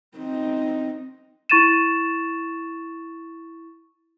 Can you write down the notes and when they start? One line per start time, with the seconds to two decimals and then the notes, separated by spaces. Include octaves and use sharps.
0.17 C4 D#4
1.50 E4 C#6 A6 D#7 E7